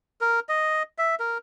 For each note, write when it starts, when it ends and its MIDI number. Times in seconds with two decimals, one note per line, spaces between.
0.21 0.40 70
0.49 0.83 75
0.98 1.15 76
1.20 1.38 70